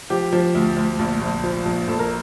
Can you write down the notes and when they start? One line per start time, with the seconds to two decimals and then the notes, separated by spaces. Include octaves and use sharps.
0.10 F3 G4
0.33 F3
0.55 D2
0.76 D2
0.99 A#1
1.21 A#1
1.44 F3
1.65 A#1
1.88 A#1 A4
1.99 A#4